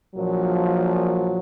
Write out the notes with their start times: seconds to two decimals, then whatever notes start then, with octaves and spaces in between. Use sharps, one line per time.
0.15 A#1 A#2 F3 F#3